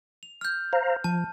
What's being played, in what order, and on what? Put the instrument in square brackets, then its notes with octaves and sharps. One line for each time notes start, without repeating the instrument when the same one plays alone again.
[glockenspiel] F7
F6 G6
[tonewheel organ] C5 F5 A#5
[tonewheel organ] F3 [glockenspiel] A5